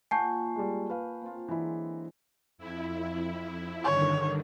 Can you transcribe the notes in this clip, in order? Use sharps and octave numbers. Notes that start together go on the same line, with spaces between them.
A#2 G4 F#5 G#5 A5 C#6 G6 C7
G3 G#3
B4 F5
A#3 C4 F4
D3 E3 F#3 G#3 E4
F2 E4
G2 D3 D#3 C#5